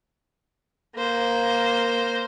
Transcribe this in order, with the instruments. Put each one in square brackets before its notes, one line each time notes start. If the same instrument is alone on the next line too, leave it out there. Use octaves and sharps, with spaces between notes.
[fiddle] A#3 C5